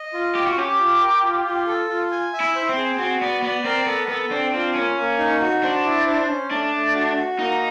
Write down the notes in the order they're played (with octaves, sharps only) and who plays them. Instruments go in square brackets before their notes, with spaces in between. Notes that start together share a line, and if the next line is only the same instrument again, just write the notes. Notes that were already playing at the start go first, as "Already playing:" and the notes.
Already playing: [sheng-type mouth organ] D#5
F4
[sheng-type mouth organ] F4 [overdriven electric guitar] G4
[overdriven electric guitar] F#4
[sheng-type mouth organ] C#4 [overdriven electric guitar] G4
[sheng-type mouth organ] F4
A#4
F4
F4
A4
F4
G#5
E5
[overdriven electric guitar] E4
[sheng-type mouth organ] C5
[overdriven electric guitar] C4
[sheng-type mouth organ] G#4
[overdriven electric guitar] C4 [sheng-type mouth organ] F#4
[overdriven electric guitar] B3 [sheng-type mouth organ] D5
[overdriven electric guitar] B3 [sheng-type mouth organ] D5
[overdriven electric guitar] C4 [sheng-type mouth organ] A#4
[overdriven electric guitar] B3 [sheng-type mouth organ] A4
[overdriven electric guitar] B3 [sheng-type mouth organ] A4
[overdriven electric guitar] C4 [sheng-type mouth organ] D4
[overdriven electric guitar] C4 [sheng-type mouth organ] F4
[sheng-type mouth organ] A#3 [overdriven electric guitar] C#4
[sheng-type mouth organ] A#3
D#4
F#4
[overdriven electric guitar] D4 [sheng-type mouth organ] C5
[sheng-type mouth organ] E4
C5
C#4
[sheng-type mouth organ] A3 [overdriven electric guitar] D4
[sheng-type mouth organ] A3
F#4
F#4
[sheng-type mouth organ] A#3 [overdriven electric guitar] D#4